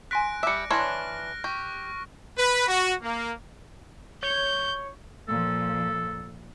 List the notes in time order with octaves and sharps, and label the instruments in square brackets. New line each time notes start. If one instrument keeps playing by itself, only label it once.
[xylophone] G#5 C6 B6 [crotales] F#6 A#6 D7
[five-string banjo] G3 E5 [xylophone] D6 C#7
[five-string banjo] E3 D4 C#5 [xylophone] C6 [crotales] F6 A#6
[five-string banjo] G4 [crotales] C#6
[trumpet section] B4
F#4
A#3
[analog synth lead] C#5 [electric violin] G6
[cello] A#2 F3 [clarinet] A4